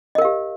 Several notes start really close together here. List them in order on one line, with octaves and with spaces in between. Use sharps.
D#5 A#4 F5 G4